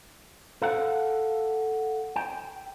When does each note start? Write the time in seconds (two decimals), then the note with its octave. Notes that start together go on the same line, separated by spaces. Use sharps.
0.62 A4 F5 F#5
2.16 G5